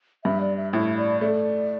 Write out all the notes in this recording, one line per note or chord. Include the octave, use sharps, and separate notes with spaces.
G2 E5
D5
E5
A2 E5
D5
A3 D5